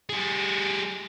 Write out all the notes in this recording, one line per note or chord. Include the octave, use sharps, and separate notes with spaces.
G3 G#4